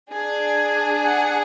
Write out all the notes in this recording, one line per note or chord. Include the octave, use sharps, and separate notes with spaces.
D4 G#4
F#5